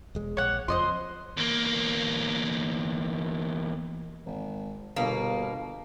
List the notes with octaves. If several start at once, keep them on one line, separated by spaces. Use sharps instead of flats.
E1 G#3
A#1 C#5 F#5
F#1 F2 F3 C5 D#5 C6
E2 A#3
G#1
G1 B2 A#3